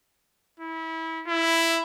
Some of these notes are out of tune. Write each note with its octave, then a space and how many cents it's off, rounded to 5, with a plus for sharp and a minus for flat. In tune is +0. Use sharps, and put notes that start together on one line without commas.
E4 -25
E4 +5